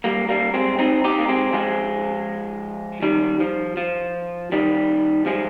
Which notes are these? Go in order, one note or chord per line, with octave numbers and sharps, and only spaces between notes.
G3 A#3
G3 A#3
G#3 C4
C4 D#4
D#4 G4
A#3
G#3 C4
F3 G#3
D#3 G3
F3
F3
D#3 G3
F3 G#3